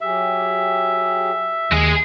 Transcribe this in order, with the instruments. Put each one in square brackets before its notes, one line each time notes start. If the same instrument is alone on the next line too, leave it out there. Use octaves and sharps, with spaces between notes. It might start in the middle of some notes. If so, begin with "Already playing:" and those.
[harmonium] F#3 G4 G#4 [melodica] E5
[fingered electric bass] D#2 [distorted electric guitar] G#3 G#4